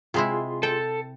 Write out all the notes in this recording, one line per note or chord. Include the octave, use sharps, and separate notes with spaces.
C3 G#3 E4 F4 G#4 C6
A4 G5